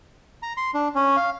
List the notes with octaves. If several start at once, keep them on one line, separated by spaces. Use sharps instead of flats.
A#5
C6
D4
C#4
F5